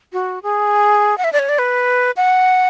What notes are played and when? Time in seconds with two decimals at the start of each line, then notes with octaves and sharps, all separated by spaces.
0.13 F#4
0.43 G#4
1.18 F#5
1.24 E5
1.33 D5
1.39 C#5
1.49 D5
1.59 B4
2.17 F#5